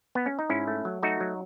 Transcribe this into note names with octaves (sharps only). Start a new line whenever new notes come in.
B3
C#4
D#4
G#2 C#4 E4
A3
F#3
A3 D#4 F#4
F#3